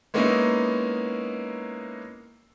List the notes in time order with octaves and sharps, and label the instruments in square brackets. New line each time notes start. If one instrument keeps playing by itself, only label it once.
[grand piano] G#3 A#3 B3 C#4 D#4 E4